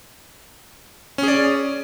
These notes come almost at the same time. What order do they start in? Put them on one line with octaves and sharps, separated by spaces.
C#4 G#4 D5